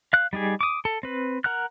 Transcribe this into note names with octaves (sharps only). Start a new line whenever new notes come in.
F5 F#6
G3 D#4 G4 G#4
D6 D#6
A4
C4 B4
A#4 F#5 F6 F#6